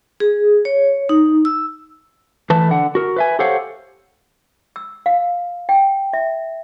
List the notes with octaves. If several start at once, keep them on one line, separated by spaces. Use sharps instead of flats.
G#4
C#5
D#4
E6
E3 A3 B4 A5
D3 F#5
F#4 A#4
B4 E5 G#5
G4 A4 C5 C#5 F5 F#5
E6
F5
G5
E5